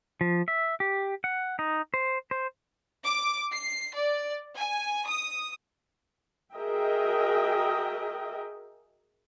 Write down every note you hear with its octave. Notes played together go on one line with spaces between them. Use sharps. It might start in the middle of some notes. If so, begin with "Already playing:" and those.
F3
E5
G4
F#5
D#4
C5
C5
D6
C7
D5
G#5
D#6
F#4 G#4 A#4 D#5 E5 G5